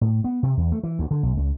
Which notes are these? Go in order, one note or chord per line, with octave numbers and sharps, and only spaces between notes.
A2
B3
C3
E2
A3
E3
D2
D3
B1
C#2